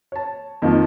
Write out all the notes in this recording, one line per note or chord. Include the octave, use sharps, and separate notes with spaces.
C#5 A5
F2 D#3 F3